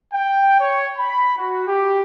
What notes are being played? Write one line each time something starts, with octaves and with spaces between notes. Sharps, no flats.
G5
C#5
B5
F#4
G4